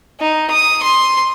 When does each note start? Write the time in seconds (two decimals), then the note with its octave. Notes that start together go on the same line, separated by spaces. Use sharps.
0.20 D#4
0.51 D#6
0.83 C6